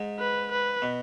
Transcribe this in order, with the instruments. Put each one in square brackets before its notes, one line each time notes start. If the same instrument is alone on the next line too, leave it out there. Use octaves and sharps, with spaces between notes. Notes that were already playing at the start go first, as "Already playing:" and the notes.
Already playing: [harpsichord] G#2
[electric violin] B4
B4
[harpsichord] B2